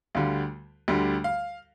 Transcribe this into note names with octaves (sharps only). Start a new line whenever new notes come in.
D2 D3 G3 F5
D2 D3 G3
F5